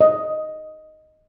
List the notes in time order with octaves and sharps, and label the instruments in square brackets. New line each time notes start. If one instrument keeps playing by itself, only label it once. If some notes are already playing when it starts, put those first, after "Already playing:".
[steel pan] D#5